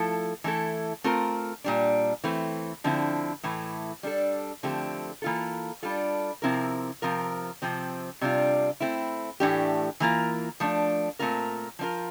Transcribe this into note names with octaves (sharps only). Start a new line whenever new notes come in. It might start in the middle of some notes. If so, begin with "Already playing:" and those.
Already playing: F3 A3 E4 A4
E3 A3 E4 A4
A3 C4 F4 A#4
A#2 G3 D4
E3 A3 C4
D3 F3 C4 E4
A2 E3 A3
G3 D4 A4
D3 F3 A3 C4 G4
E3 A#3 F4 A4
G3 D4 F4 A4
C3 F3 C4 E4 A#4
C3 F3 C4 F4 A#4
C3 F3 C4
C3 G3 D4 F4
A3 C4 E4
A2 E3 A3 D4 G4
E3 A#3 F4 A#4
F3 A3 D4
A#2 A3 C4 F4 A#4
F3 C4 F4 A#4